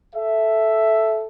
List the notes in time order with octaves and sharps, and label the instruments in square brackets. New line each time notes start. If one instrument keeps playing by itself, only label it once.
[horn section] A4 E5